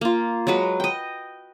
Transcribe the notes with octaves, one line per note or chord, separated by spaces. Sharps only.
A#3 F4
F#3 G#3 F#4 B4
D#5 G5